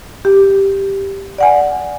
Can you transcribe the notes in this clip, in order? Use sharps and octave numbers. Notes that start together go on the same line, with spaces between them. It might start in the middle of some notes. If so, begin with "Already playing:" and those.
G4
D5 F#5 G#5